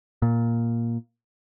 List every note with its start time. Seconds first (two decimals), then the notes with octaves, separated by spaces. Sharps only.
0.22 A#2